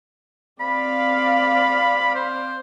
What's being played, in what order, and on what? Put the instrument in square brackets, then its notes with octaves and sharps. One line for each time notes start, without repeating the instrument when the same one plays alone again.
[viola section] C4 D5 F5 [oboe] B5
[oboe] C5